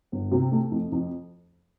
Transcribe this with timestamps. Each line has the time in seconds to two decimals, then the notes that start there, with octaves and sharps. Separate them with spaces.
0.12 G1
0.31 C3
0.51 A3
0.71 F2
0.92 F2